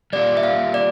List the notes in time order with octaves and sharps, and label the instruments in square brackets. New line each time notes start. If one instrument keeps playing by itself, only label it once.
[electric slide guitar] G3 A#3 F4 [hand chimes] D5
[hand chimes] E5
F5
D5